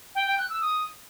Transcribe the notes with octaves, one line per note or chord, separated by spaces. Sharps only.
G5
G5
F#6
E6
D#6